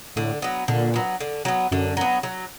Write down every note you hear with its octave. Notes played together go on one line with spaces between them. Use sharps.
A2 D3
F#3 B3
A#2 D3
F#3 B3
D3
F#3 B3
F#2 D3
F#3 B3
F#3